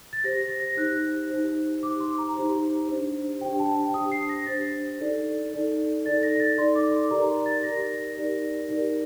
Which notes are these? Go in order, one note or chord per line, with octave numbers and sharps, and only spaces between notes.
A6
G4 C5 A#6
A#6
A#6
D#4 G4 C5 F#6
D#4 G4 C5
D#4 G4 C5 D6
C6
A#5
D#4 G4 C5
D4 G4 C5
D4 G4 C5 G5
A5
G5
D4 G4 C5 D#6
C7
A#6
D4 G4 C5 A6
D#4 A4 D5
D#4 A4 D5
D#4 A4 D5 A6
A#6
A6
D#4 A4 D5 C6
D6
C6
D#4 G4 A#4 D5 A#5
C6
A6
D#4 G4 A#4 D5 A#6
D#4 G4 A#4 D5
D#4 G4 A#4 D5